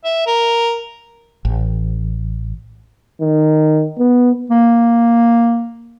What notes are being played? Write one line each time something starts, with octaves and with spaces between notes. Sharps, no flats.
E5
A#4
A1
D#3
B3
A#3